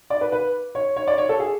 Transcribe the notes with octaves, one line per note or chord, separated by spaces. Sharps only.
D5
B4
B4
C#5
C#5
D5
C#5
A4
G#4